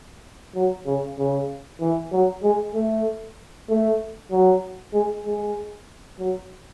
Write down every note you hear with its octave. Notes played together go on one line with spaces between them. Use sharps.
F#3
C#3
C#3
E3
F#3
G#3
A3
A3
F#3
G#3
G#3
F#3